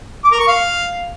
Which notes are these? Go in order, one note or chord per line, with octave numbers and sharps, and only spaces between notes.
D6
A#4
C#6
F5